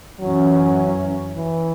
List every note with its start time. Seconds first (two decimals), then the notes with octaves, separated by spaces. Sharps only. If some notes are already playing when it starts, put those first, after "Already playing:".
0.19 F#2 E3 F#3 C#4
1.36 E3